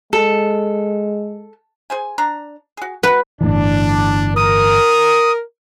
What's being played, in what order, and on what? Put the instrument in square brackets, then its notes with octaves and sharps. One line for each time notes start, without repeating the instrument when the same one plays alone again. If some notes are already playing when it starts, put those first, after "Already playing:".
[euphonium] G#3 [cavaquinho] A4
[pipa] G#4 C5 G#5
D4 A#5
F#4 G#4
[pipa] F#4 F#5 [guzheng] B4
[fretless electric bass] G1 A2 E3 [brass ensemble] D4
[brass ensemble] A#4 [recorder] D#6